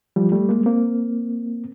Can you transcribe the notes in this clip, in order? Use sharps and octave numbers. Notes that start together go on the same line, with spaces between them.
F3 G3
G3 A3
G#3 A#3
A#3 C4